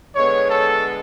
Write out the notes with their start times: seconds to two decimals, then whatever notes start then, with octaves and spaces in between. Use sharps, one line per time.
0.15 D3 G#3 B3 C#5
0.50 A4